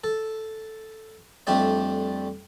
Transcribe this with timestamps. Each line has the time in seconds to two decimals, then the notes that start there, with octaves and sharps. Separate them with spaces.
0.04 A4
1.47 F2 G3 A3 D4 G4 D5